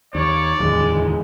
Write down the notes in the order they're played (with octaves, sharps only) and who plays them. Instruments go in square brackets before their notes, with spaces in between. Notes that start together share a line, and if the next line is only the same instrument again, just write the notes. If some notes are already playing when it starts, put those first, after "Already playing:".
[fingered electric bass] D#2 [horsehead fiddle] C#5 [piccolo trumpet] D5
[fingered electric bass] D1 E2 D#3 [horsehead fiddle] G#3